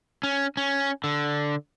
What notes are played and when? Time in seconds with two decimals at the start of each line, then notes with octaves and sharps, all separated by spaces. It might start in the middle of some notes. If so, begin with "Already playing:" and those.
0.23 C#4
0.57 C#4
1.04 D3